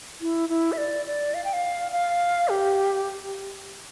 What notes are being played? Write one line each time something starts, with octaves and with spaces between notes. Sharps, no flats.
E4
E4
E5
D5
D5
F5
G5
F5
F5
G4